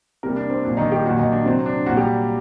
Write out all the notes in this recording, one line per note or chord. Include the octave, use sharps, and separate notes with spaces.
C3 G3 A#3 A#4
D4
C4
A#2 F#3 D4
D#3 D#4
G3 G4
A#2 F#3 F#4
D#3 D#4
D4
C3 F#3 C4
D4
A#2 F#3 F#4
G3 G4